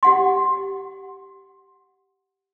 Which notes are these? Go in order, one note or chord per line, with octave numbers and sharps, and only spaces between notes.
G4 F#5 C6